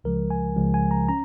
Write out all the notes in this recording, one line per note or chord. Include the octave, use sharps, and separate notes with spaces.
C#2 C#3 F3 G#3 A#4
G#5
C#2 C#3 F3 G#3
G#5
A#5
C#4 A#5